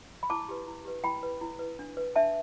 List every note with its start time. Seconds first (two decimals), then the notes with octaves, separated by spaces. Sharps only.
0.23 B5
0.30 E4 A5 D6
0.48 G4 B4
0.67 E4
0.85 G4 B4
1.04 E4 G5 B5
1.23 B4
1.41 E4
1.59 B4
1.79 D4
1.97 B4
2.16 D4 E5 A5